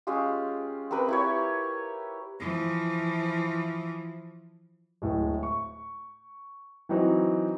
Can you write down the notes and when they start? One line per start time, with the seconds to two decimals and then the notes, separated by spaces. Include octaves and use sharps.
0.07 G#3 C#4 F4 G4
0.91 C4 G4 A#4 B4
1.09 E4 G4 C#5
2.40 E3 F3
5.02 D1 A2 G#3
5.43 C#6
6.89 E3 F#3 C4 D#4 E4 F#4